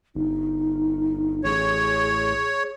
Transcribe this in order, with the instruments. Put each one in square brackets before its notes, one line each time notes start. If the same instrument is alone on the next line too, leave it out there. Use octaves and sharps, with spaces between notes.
[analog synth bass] G1 [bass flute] D#4
[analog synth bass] A1 [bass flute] G#4 [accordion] C#5